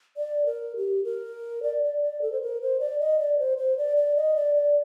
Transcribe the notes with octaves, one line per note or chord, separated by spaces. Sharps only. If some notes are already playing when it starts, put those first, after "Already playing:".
D5
A#4
G4
A#4
D5
D5
D5
A4
C5
A#4
C5
D5
D#5
D5
C5
C5
D5
D5
D#5
D5
D5